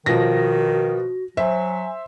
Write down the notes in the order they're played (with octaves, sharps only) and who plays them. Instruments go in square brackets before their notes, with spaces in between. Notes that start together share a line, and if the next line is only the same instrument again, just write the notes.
[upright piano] B2 F3 [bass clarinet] D#3 [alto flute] F#4 [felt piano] A#6
[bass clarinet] F#3 [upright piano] C5 [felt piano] E5 [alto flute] G#5